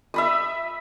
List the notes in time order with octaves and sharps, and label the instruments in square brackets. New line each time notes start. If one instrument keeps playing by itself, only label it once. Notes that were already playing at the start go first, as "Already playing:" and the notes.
[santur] E5 B5 D#6